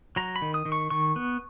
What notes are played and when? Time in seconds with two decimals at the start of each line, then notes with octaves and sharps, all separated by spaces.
0.16 F#3 A#5
0.36 B5
0.42 D#3
0.54 D#6
0.65 D#3
0.72 C#6
0.90 D#3 C#6
1.16 B3